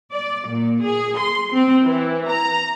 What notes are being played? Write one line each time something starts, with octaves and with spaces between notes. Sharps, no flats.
D5
A#2
G#4
C6
C4
E3
A#5